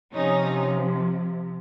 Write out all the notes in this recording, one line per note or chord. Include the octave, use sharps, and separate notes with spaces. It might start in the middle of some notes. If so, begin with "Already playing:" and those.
C3 F3 C#4 D#4